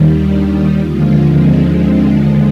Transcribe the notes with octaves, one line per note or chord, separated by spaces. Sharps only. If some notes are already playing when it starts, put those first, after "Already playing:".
Already playing: D#2 D#3 G3
D4
D#4
D#2 D3 F3 G#3 F4
C4
C4